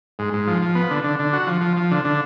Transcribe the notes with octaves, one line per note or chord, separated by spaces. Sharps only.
G#2
G#2
F3
F3
B3
D3
D3
D3
F#4
F3
F3
F3
D3
D3